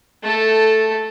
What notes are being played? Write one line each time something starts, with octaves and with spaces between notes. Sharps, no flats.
A3 A4